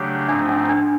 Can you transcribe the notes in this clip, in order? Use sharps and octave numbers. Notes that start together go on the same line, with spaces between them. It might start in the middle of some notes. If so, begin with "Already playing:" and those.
Already playing: C#3 F#3 A3 D4 G4
G#2 F3 A3 C4 D4 D#4
C#4
D4